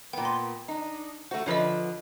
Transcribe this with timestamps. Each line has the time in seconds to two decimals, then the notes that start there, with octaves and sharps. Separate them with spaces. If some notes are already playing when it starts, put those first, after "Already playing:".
0.13 A#2 B3 G5
0.25 C6
0.68 D4 D#4
1.31 A3 F#4 C5
1.46 D3 F3 B4 C#5 D#5